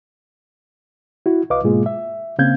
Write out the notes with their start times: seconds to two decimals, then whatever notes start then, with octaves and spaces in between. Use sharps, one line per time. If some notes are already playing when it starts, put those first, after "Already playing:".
1.26 E4 F#4
1.50 C2 B4 D#5 F5 D6
1.64 G#2 B2 G#3 A#3 F4 G#4
1.86 E5
2.39 C#3 A#3 C4 F5 G6 G#6